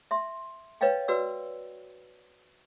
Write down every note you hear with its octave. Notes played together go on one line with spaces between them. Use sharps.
E5 C6
B4 C#5 D#5 F5 G5
F#4 B4 D5 E6